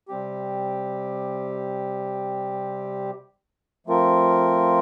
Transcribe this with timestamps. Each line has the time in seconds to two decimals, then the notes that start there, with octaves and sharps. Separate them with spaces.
0.08 C3 G3 C4 G4
3.87 F3 A3 C4 F4 A#4